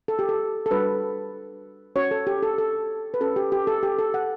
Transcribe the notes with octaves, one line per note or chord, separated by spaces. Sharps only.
A4
G4
A4
A4
G3 D4 F#4 B4
C#4 F#4 C#5
A4
G4
A4
A4
B4
C#4 F#4 A4
G4
G4
A4
G4
A4
F#5